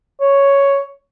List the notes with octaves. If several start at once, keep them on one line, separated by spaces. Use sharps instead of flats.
C#5